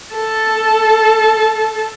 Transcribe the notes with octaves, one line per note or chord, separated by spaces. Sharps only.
A4 A5